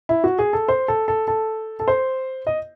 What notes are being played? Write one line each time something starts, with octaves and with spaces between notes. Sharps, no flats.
E4
F#4
G#4
A4
C5
A4
A4
A4
A4
C5
D#5